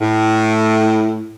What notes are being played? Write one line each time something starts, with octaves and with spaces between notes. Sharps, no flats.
A2